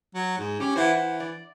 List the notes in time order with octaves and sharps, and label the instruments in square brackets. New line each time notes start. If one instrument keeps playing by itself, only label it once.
[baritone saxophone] F#3
G#2
[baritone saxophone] C#4 [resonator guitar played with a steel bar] G4
[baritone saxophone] E3 [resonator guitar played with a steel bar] C5 E5 F#5
[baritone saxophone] E3
[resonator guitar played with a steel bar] D5